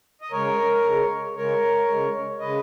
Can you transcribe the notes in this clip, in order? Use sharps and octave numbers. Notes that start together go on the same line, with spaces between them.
D#5
C#3 G#3 A#4 C#5
C#3 G#3
C#3 G#3 A#4 C#5
C#3 G#3
C#3 G#3 B4 D#5